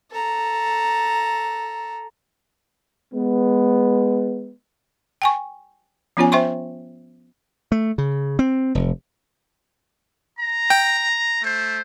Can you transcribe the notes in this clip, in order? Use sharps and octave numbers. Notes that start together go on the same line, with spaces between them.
A4 A#5
G#3 B3
G5 G#5 C#6
F3 B3 C#4 F4 C#5 G#5
C5 E5 G5 C6 C#6
A3
C#3
C4
F1
A#5
G5
A3 C5